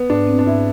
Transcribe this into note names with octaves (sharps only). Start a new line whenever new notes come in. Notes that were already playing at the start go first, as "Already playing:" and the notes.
Already playing: B3
G#2 D4
C4
D4
G#2 E4